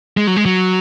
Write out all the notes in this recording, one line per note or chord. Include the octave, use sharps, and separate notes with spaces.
G#3
F#3
G#3
F#3